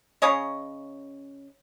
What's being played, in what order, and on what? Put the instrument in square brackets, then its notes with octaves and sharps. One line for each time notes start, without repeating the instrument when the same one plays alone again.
[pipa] C#3 C#4 C#5 D#5